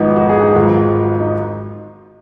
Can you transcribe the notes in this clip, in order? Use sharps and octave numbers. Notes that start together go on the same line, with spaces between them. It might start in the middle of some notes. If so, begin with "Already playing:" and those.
Already playing: G#1 G#2 F3 B3 D#4 F#4
F#4
G#4
D#4 F#4
G#1 G#2 F#3 F4
D#4